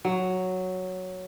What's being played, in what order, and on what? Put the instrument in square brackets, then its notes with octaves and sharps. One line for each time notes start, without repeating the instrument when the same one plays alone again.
[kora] F#3